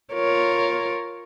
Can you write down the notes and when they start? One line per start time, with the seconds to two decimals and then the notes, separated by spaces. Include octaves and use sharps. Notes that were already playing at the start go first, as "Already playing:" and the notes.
0.13 F4 A#4 C#5